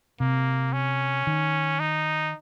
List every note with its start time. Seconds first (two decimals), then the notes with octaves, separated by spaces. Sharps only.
0.20 C3 A#3
0.73 C#4
1.27 D#3
1.80 D#4